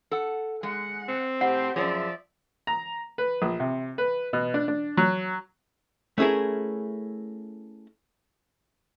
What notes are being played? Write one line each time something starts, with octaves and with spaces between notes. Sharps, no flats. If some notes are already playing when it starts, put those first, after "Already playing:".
A4 F#5
G#3 F#5
C4
A2 G4 C5 F#5
F#2 B2 F3 G#4 D5 E5
A#5
B4
A#1
C3
B4
B2
D4
D4
F#3
A3 C#4 E4 G#4 A#4